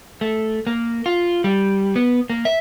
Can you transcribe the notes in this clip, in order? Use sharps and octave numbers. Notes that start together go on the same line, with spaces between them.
A3
A#3
F4
G3
B3
A#3
E5